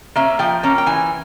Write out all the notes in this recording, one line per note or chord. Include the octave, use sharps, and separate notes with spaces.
A#3 C#4 E5
F3 G5
A#3 C#4
G5
E3 G#5